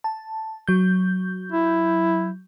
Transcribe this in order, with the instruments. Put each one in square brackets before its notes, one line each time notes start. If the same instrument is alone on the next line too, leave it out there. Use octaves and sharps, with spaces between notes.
[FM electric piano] A5
F#3 G6
[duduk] E4